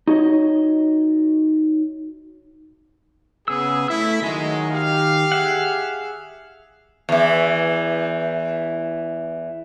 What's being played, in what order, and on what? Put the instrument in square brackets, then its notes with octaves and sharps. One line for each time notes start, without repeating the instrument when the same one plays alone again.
[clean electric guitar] D#4 F#4 C#5 D#5
[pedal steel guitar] C#3 E6 [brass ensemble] B3 G#4
[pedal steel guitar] A3 E5 E6 [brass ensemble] E4
[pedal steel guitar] D#3 D#5 G#5 [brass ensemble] F#3 G#3
[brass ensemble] G4 F5
[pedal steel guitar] G#4 E5 F#5
[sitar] E2 E3